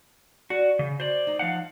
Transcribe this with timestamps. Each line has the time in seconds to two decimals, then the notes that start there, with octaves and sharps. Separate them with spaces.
0.50 F#4 D5
0.79 C#3
1.00 F#4 C5 D5
1.27 D#4
1.39 F3 F5 F#5